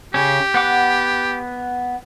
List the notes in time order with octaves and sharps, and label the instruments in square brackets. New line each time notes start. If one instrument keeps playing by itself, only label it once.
[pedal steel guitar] C#3 C#4 [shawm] G4
[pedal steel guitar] B3 F#5 D6